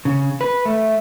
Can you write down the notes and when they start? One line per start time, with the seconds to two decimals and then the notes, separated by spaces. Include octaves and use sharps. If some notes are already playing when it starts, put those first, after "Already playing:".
0.05 C#3
0.41 B4
0.65 A3